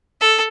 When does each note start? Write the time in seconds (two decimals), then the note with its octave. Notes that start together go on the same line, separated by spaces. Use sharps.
0.21 A4